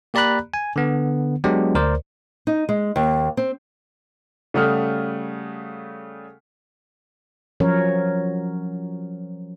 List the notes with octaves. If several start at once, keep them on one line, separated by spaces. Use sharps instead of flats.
A#3 G4 D5 A#5 B5 F#6
G#5
D3 B3
F#3 G#3 B3 D4 G4
D2 A#4 C5 D5
D#4
G#3
D#2
C4
C#3 G3 A3 F#5 D#6 F6
F3 F#3 C#4 A#4 C#5